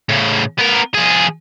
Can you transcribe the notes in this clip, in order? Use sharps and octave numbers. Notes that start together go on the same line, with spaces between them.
A2 C#3
B3 A#4
F3 G#4